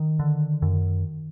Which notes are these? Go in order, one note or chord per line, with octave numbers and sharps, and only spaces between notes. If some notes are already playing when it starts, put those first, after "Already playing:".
Already playing: D#3
D3
F#2